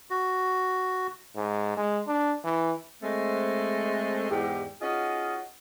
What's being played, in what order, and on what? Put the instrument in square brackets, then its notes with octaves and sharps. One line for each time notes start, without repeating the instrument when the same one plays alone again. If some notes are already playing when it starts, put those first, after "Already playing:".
[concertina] F#4
[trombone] G#2
G#3
D4
E3
[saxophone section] G#3 A3 C4
E2 G#2 G4
C#4 D#4 F4 F#4 G#4 D#5